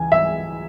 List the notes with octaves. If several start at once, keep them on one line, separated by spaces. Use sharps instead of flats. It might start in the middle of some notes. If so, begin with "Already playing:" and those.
Already playing: C#2 E3 G#5
E5